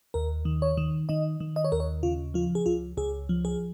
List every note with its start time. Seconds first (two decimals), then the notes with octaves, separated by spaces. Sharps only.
0.14 D#2 A#4
0.45 D#3
0.62 C#5
0.77 D#3
1.09 D#3 D#5
1.40 D#3
1.56 D#5
1.65 C#5
1.72 D#2 A#4
1.80 C#5
2.03 C#3 F4
2.34 F3 F4
2.55 G#4
2.66 C#2 F4
2.97 C#2 G#4
3.29 F3
3.45 G#4